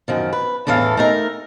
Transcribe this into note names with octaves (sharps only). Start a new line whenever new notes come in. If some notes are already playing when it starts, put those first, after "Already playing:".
F#2 D#3 F3
B4
E2 A2 E3 A4 F5
A3 D#4 A#4